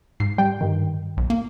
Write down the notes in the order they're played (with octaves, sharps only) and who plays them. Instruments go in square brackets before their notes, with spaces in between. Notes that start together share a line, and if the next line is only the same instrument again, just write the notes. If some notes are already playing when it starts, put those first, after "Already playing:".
[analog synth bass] G#2 [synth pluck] C7
[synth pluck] G3 G5
G2 D#3
[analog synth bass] B1
A#3